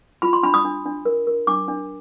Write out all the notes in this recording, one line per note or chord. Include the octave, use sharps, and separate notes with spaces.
F4 B5
C6
D4 B5
D#6
D4
D4
A#4
A#4
D4 D6
D4